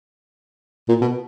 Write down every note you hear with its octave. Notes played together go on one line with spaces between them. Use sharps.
A#2
B2